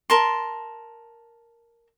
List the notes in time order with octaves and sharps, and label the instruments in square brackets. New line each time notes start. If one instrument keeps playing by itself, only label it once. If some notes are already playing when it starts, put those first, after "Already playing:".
[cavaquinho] A#4 A5 C6